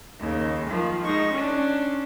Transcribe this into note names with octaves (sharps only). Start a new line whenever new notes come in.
D#2 C#3
D#3 F3
G#2 D#4 C6 C#6
C#4 D4